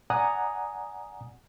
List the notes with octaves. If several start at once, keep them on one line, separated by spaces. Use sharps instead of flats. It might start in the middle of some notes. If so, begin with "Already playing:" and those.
D5 F#5 G#5 A#5 D#6